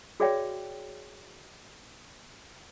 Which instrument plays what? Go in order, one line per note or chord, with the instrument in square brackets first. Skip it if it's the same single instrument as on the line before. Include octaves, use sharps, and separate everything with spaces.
[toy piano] F#4 G#4 C#5 D5 E5 G5